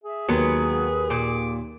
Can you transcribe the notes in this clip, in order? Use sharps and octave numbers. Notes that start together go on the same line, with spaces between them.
G#4 E5
D#2 F#3 G#3 B3 B4
A#2 D6